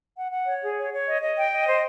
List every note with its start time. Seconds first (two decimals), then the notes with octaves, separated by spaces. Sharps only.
0.17 F#5
0.32 F#5
0.48 C#5
0.62 G#4
0.77 C#5
0.93 C#5
1.07 D#5
1.23 D#5
1.37 G5
1.53 D#5
1.67 C5